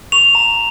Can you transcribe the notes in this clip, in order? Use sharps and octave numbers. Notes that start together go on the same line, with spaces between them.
C#6 F7
A#5